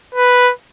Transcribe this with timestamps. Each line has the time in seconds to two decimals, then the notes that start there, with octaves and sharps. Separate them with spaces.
0.15 B4